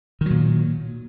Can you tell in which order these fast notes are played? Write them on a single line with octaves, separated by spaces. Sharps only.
D#3 F#3 A#2